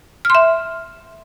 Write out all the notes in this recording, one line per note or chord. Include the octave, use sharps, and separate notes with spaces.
E5 C6 F6